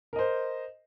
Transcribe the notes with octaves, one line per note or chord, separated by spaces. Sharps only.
A#4 C5 D#5